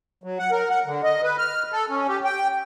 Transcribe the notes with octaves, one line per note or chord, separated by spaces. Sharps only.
F#3
F#5
A#4
F#5
D3
D#5
B4
F6
A4
C#4
G4
G5